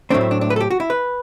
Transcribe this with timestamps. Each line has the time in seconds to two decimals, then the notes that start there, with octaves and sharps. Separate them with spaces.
0.10 A2 F#3 A3 C4 D4
0.21 E4
0.31 D4
0.41 D4
0.50 B4
0.56 A4
0.60 G4
0.70 F#4
0.80 E4
0.90 B4